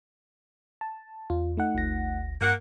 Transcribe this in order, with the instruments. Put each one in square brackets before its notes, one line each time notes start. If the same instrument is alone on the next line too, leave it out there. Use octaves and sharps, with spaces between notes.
[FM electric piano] A5
[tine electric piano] E2 [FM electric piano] F4
[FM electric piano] A3 D#4 F#5
[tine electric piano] G1 D2 A#6
[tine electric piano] G2 [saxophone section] A#3 F#5